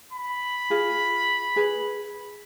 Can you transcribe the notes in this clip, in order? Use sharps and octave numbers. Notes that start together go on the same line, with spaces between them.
B5
F4 G#4
G#4 B4